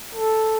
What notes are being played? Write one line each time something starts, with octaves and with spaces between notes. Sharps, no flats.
A4